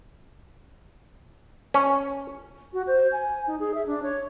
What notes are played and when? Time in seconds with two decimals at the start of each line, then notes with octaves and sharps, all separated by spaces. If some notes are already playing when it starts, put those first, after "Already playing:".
1.74 C#4
2.73 F#4
2.87 C5
3.12 G#5
3.47 D#4
3.60 G#4
3.74 E5
3.86 D4
4.03 C#5